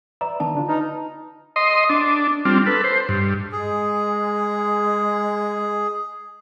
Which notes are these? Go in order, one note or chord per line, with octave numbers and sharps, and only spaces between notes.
B4 D5 E5 A#5
D#3 B3 D4 A5
D3 D4 F4
D#4 B4 A5 F6
D#5 C6
D4
G3 C4 D4 F4
A4 B4
C5
G2
G#3 G#4